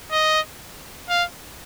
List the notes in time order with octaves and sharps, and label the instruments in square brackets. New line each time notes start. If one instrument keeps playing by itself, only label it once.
[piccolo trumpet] D#5
F5